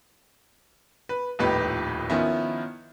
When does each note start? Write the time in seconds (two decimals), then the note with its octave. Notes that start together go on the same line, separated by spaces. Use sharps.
1.09 B4
1.39 D#1 F2 A2 D#4 G4 B4
2.10 D#3 F3 B3 C#4 E4